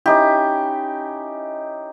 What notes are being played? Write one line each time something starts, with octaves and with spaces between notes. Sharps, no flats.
C#4 D#4 E4 G4